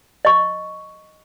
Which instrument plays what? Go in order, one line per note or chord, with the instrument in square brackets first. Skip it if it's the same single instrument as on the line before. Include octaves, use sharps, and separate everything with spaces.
[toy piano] D#5 C#6